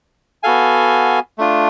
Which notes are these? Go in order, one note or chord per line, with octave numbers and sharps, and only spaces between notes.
B3 F#4 A4 F5 G#5
A3 D4 F4